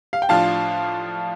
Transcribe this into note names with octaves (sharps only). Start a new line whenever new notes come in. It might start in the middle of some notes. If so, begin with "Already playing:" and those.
F5
G5
A2 F3 D4 F4 F5 A5